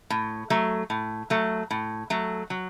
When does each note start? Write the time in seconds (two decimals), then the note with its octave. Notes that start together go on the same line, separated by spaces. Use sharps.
0.10 A2
0.50 F#3 A3
0.90 A2
1.30 F#3 A3
1.71 A2
2.10 F#3 A3
2.50 F#3